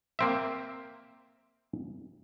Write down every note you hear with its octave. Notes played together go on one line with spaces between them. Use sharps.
A#3 C4 E5